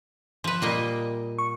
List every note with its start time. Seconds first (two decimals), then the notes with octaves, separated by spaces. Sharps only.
0.44 F3 B4
0.62 A#2 G3 A#3 D#5
1.38 C#6